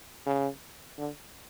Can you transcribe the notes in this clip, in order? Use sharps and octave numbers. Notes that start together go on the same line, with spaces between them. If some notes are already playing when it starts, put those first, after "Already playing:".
C#3
D3